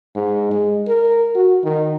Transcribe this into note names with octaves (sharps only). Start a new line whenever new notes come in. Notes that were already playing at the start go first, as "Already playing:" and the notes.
G#2
G#3
A#4
F#4
D#3